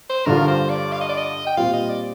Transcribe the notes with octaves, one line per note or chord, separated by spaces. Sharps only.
C5
G2 D3 G3 D4 F4 A#4
C5
D5
F5
D#5
D5
D#5
G5
A#2 G3 C4 F4 F5
D#5
D5